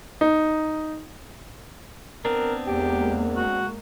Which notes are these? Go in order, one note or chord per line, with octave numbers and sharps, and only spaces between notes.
D#4
B3 C4 D4 A#4
E2 G#3 A#3 G4
F#4